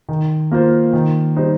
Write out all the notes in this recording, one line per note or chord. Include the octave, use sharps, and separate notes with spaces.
D#3
A#3 F4 C5
D#3
G3 D#4 C5